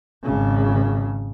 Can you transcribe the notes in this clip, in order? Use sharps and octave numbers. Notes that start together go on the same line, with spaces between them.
G#1 C#3